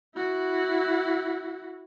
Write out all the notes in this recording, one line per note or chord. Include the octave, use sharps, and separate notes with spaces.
E4 F#4